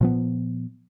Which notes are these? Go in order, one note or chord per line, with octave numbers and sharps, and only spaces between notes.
A#2 F3 B3